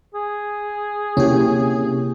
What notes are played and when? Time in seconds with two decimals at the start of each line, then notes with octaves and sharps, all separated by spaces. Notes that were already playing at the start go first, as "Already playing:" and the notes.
0.15 G#4
1.17 C3 A#3 C#4 E4 G4